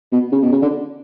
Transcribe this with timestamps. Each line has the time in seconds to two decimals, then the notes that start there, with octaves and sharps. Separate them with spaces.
0.12 B2
0.32 C#3
0.42 B2
0.52 C#3
0.62 D3